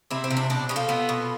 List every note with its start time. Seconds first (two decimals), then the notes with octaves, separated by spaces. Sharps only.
0.11 C3 C4 E4
0.24 C4
0.31 C3
0.37 D4
0.50 B2 D4
0.69 B2 G4
0.76 F4 A4
0.89 B3
1.09 B2